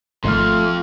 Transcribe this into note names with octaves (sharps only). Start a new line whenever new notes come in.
G#1 F2 A3 C6 F6